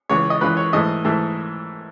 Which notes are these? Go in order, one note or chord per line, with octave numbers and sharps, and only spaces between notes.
C#2 C#3 E3 C#5
D#5
C#2 C#3 E3 B4
C#5
G#2 E3 A3 D#5
G#2 E3 A3